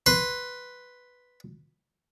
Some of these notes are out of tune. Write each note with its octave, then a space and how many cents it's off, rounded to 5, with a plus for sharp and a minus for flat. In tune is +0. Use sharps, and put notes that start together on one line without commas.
B4 +0 C6 +0